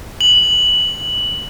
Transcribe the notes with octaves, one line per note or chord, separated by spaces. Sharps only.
F#7